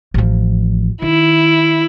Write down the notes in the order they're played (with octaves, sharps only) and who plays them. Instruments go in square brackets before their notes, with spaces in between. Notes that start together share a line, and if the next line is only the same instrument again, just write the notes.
[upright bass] A1 F3
[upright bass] D#3 [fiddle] E4